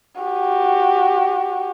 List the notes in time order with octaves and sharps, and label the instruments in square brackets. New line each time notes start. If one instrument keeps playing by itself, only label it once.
[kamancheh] F#4 G4